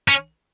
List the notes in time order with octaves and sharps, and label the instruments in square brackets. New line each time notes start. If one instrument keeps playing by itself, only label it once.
[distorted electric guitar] C#4